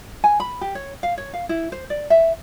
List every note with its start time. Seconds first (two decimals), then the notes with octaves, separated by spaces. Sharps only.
0.24 G#5
0.40 B5
0.61 G4
0.75 C#5
1.03 F5
1.18 C#5
1.34 F5
1.49 E4
1.72 C5
1.90 D5
2.10 E5